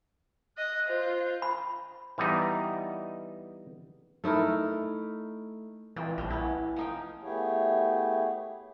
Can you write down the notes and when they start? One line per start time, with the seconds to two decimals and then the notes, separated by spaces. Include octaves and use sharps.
0.57 D#5 F#6
0.88 F4 C5
1.42 B5
2.18 E3 G3 B3 D#4
4.24 A3 D#4 E4 A#4
5.96 E3 F3 C4 D5
6.18 A#1 G3 D4
6.31 B3 C#4 E4
6.76 F3 D#4 G5
7.23 A3 B3 E4 G4 G#4 C#5